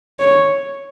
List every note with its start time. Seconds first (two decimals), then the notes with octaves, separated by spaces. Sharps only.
0.19 C#5